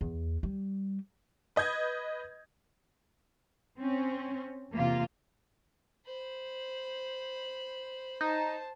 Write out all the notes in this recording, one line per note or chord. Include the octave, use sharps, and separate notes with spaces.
E2
G3
B4 D#5 G6 G#6
C4 C#4
E2 C3 A#3 F4 F5
C5 B5
D#4 C5 A5